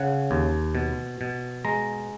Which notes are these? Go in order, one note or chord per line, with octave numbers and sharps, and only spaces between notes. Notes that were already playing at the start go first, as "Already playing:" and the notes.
Already playing: C#3 F#5
D#2
B2
B2
G#3 A#5